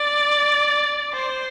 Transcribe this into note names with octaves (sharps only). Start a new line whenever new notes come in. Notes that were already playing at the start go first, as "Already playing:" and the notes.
Already playing: D5
C5